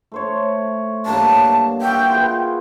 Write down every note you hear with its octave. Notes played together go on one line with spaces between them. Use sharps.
A3 C5 C#5
G2 F#3 A#3 A5
F#4 E5 G5
F4 G#4 B4